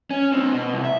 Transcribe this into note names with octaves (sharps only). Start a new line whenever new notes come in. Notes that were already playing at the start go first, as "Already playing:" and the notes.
C#4
C4 D4
B2
C2
E5